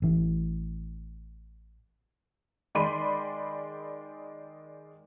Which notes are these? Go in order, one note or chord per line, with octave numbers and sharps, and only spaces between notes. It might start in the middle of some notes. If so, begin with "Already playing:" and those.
A1 E3
D#3 G#3 D5 B5 C6 D#7